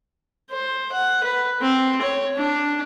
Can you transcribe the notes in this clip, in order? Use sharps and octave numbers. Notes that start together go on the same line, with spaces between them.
C5
F#5
B4
C4
C#5
D4